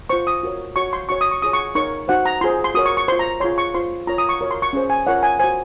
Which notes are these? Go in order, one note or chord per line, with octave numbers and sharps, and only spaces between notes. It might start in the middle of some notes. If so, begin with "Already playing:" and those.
F4 C5 C#6
D#6
F#4 A#4 C#5
F#4 C#5 C#6
C6
F#4 C#5 C#6
D#6
C#6
F4 G#4 C#5 D#6
C#6
D#4 A#4 C#5 C#6
D#4 F#4 C5 F#5
A#5
F4 G#4 C5 C6
C6
F#4 A#4 C#5 D#6
C#6
C#6
F4 C5 C6
A#5
F4 G#4 C#5 C6
C#6
F4 C5 C6
F4 A#4 C#5 A#5
D#6
C#6
F#4 A#4 C#5
C6
C#6
C#4 G#4 C5
G#5
F4 A#4 C#5 F#5
G#5
F#4 C5 G#5